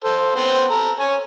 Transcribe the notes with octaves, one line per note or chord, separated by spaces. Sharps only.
A4 C5
B3 C4 C5
A4 A#5
C#5 G#5